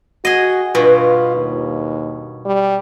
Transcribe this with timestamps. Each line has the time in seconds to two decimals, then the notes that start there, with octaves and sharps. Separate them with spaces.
0.25 F#4 G#4 D#5
0.75 G2 B2 F4
1.36 D#2
2.46 G3